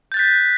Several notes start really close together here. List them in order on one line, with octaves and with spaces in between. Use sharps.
G6 A6 F#6 B6